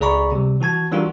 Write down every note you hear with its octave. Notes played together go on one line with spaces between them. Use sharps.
C#2 G#4 D5 A#5 B5 C#6
C3 G3
E3 F#4 A5 G#6
E3 G3 D4 F4 F#4 A#4